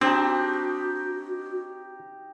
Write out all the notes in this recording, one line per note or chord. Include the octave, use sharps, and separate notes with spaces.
C4 D4 D#4 F#4 G4